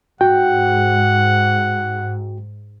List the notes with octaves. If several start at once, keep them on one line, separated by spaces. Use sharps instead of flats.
G#2 F#4 F#5 G5